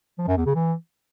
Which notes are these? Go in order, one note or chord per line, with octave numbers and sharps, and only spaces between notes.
F3
F#2
E2
C#3
E3